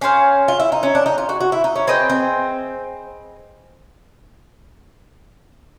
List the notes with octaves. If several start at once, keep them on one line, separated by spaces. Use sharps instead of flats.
C#4 G#4 C5 F5
F4
E4
D#4
C#4
D4
D#4
F4
F#4
F#4
E4
D#4
C#4
C4 G#4 B4 D#5 G5
C4